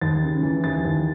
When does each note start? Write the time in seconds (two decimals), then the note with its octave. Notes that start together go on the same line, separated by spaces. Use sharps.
0.01 D#2 A6
0.23 C#3
0.43 E3
0.64 D#2 A6
0.85 D#2